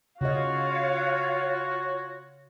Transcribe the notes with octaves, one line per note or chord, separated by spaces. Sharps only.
C#3 F4 F#4 C#5 D#5 F5